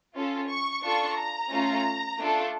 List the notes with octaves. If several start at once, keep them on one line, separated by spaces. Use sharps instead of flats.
C#4 F4 A4
C#6
D4 F4 A4 C#6
A#5
A3 C#4 F4
A3 D4 F4 A4